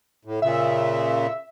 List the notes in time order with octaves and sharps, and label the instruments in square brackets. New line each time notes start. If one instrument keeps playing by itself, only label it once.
[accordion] A2
[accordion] A#2 C#3 [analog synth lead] E5